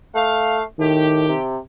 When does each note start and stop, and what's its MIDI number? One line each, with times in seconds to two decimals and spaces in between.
0.14 0.63 57
0.14 0.57 77
0.79 1.27 45
0.79 1.36 51
0.79 1.39 67
1.29 1.57 48